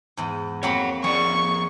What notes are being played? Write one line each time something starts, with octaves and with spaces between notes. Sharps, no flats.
E2 G#2
F2 A#3 C#5 F#5 B5
F3 G#4 C#5 D5 C#6